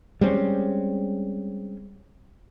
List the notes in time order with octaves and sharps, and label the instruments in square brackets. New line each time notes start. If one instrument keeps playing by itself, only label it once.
[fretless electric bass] G3 G#3 C4 C#4